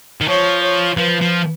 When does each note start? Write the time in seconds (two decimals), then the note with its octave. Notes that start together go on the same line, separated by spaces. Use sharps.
0.21 D#3
0.28 F3 C#5
0.62 C#5
0.97 F3 B4
1.21 F3